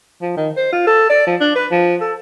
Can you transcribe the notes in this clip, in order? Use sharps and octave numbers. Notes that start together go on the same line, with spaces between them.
F3
D#3
C5
F4
A4
D5
F3
D4
B4
F3
A4